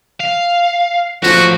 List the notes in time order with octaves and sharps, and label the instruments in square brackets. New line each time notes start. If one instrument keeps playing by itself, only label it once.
[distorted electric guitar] F5
[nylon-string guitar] F3 F4 [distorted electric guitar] A3 C#4 [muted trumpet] F#4